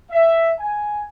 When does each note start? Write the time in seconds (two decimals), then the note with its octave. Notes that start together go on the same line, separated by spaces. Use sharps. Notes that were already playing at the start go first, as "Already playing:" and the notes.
0.11 E5
0.59 G#5